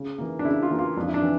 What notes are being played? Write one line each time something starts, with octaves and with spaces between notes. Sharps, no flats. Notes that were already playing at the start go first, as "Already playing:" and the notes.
Already playing: C#3
E3 A#3
D4
C#3 E4
F4
E3 A#3
F4
F2 D4
E4
D4
E3